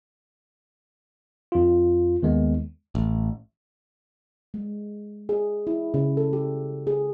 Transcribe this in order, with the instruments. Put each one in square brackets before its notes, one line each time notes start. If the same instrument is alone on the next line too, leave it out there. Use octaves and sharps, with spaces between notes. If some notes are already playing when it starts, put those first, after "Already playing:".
[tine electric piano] F2 F4
D#2 D#3 G#3 B3
[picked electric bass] A1
[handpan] G#3
G#4
E4
C#3
A4
G4
G#4